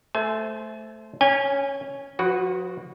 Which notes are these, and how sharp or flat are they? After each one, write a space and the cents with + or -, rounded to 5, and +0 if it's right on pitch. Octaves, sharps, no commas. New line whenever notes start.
A3 -5 C5 +0 G#5 +40
C#4 +0 G#5 -30
F3 +40 F#4 +0 B4 +0